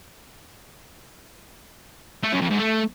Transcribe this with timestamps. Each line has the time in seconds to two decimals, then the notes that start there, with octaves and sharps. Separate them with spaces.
2.23 A3
2.32 F#2
2.41 F2
2.50 G#2
2.59 A3